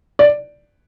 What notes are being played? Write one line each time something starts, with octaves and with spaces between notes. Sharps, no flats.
D5